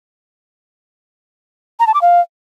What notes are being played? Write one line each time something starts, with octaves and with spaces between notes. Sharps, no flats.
A#5
A5
D6
F5